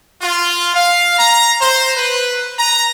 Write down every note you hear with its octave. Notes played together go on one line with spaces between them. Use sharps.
F4
F5
A#5
C5
B4
A#5